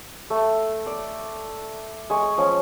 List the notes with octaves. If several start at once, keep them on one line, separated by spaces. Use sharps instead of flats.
A3
D5
G#3 G#5 C#6
F3 C#4